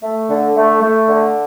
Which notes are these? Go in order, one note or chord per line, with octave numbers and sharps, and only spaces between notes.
A3
D3
A3
A3
D3